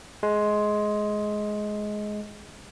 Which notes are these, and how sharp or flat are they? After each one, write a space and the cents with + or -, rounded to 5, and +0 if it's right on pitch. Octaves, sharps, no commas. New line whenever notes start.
G#3 +15